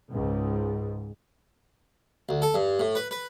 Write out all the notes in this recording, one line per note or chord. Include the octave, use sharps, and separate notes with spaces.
C#2 G#2
D2
A4
G2
A2
B4
B4